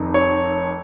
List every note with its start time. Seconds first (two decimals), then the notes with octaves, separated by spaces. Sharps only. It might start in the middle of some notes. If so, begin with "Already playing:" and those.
Already playing: F1 F2 D#3
0.14 C#5